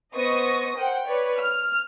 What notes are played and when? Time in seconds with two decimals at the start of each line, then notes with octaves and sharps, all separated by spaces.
0.14 B3 C5 D#5 C#6 D#6 A#6
0.77 A#4 C5 F#5 G5
1.06 B4 C#5 D5
1.37 F6